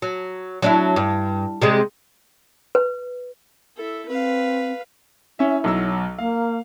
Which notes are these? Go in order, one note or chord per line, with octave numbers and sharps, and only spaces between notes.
F#3
F#3 D4 E4
G2
C3 G3 G#3
B4
E4 A4
C4 B4 F5
C#4 E4 E5
B1 F#3 E6
A#3 F5